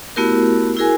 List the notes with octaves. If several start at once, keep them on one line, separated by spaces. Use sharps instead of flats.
A3 B3 E4 F#4 G4 A#4
E4 F#4 G#4 A#4 G#5